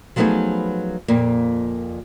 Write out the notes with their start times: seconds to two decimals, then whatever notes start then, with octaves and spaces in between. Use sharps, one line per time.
0.16 F3 F#3 A3 B3 D#4 G#4
1.08 F2 A#2 A#3